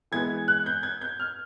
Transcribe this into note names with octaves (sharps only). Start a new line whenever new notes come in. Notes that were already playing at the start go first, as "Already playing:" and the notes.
E3 G#3 B3 G#6
F#6
G6
G#6
G6
F6